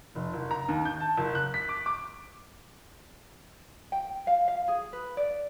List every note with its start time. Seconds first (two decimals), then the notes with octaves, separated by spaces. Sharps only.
0.15 F1
0.34 F#1
0.51 A#5
0.68 D#2
0.85 G6
1.00 A5
1.18 F#1
1.35 F#6
1.54 B6
1.69 D6
1.86 D6
3.92 G5
4.27 F5
4.48 F5
4.68 G#4
4.93 B4
5.17 D5